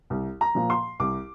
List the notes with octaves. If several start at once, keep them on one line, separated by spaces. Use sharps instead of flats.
C2
A#5
A#2 F3
C6
C2 D6